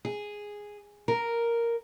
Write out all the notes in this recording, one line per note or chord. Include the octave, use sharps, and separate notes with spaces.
G#4
A#4